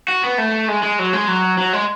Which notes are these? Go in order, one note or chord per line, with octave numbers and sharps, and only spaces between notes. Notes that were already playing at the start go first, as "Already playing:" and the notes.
F#4
B3
A3
G#3
G#3
F#3
G#3
F#3
F#3
G#3